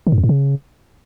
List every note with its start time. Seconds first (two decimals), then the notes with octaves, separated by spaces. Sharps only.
0.07 D#3
0.12 G#2
0.18 F2
0.24 A2
0.29 C#3